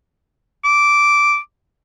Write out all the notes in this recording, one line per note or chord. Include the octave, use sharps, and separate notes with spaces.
D6